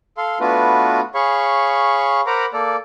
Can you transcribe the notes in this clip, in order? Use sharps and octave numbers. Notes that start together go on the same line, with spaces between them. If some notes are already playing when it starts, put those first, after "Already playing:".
A4 F5 C6
A3 B3 D4 F4 F#4 B4
G#4 C#5 F5 B5 C#6
A#4 C5 F#5 A#5 B5 D6
A#3 A4 D5